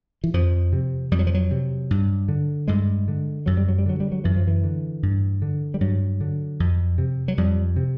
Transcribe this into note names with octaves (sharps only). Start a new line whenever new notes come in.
E3
F2 F3
C3
F2 G3
F#3
F3
F#3
C3
G2
D3
G2 G#3
D3
F#2 F#3
G3
F#3
G3
D3 F#3
G3
F#3
F#2 E3
F3
E3
D3
G2
D3
G3
G2 F#3
D3
F2
C3
F#3
F2 G3
C3